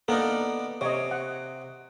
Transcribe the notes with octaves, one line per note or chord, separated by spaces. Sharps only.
A#3 B3 D4 D#4 A4 A#4
C3 C#5 D#5
F#5